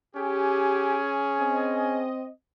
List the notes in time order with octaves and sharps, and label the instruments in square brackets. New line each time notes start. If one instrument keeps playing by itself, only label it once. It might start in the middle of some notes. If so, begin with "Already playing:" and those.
[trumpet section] C#4 G#4 [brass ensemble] G4
[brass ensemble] C4 D#5